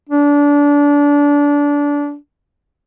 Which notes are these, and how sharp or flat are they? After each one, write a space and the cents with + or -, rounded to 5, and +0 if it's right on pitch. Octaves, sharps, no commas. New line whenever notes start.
D4 -25